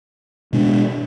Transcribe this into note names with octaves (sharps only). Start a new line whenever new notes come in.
B2 G#3 B3 D4